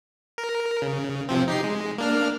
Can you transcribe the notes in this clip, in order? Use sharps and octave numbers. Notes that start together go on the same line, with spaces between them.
A#4
C#3
C3 F3 C4
D#4 G4 C7
G#3
A#3 D4 F6